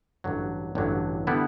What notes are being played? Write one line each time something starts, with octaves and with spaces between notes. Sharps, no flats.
A1 G2 D3 F#3
A1 G2 D3 F#3
D3 G3 B3 E4